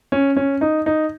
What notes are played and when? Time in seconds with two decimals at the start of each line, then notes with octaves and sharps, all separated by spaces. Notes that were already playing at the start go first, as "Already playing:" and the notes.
0.12 C#4
0.37 C#4
0.61 D#4
0.86 D#4